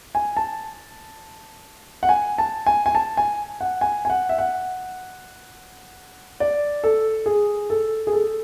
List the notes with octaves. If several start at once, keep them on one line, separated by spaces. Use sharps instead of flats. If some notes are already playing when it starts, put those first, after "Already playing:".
G#5
A5
F#5
G#5
A5
G#5
G#5
A5
G#5
F#5
G#5
G#5
F#5
E5
F#5
D5
A4
G#4
A4
G#4
A4